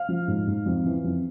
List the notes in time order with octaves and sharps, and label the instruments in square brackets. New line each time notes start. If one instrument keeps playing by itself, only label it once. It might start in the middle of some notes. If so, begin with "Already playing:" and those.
Already playing: [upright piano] F5 F6
F3
G#2
G#2
F2
E3
F2